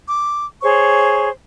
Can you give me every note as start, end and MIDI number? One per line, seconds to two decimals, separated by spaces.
0.09 0.44 86
0.63 1.29 68
0.63 1.29 72
0.63 1.29 73
0.63 1.29 85